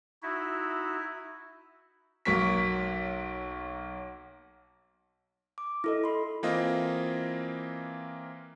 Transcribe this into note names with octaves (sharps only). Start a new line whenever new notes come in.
D#4 E4 F#4 E5
B1 F#3 A#3 C#6 B6
D6
E4 A4 D#5
B5 C6
E3 A#3 C4 F4 D#5